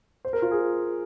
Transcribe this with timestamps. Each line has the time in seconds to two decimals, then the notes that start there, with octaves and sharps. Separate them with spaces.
0.25 C5
0.33 A#4
0.42 F4
0.51 G#4